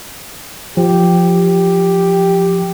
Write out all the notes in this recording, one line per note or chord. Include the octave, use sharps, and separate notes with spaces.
F3 G4